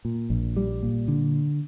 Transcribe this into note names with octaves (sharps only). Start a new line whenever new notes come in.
A#2
A#1
G3
A#2
D3